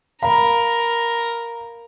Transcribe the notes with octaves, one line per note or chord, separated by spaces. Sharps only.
A#4 F5 A#5 B5